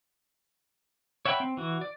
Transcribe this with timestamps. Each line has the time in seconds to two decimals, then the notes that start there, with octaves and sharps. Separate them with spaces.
1.25 C#5 E5 F#5 G5 B5
1.40 C4
1.57 E3 F#4
1.81 D5